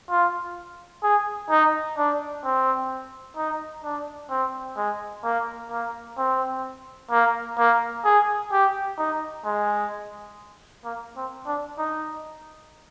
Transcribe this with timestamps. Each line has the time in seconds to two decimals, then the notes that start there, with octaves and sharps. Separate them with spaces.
0.10 F4
1.03 G#4
1.50 D#4
1.97 D4
2.44 C4
3.37 D#4
3.84 D4
4.30 C4
4.77 G#3
5.24 A#3
5.71 A#3
6.17 C4
7.11 A#3
7.58 A#3
8.04 G#4
8.52 G4
8.98 D#4
9.45 G#3
10.85 A#3
11.16 C4
11.47 D4
11.78 D#4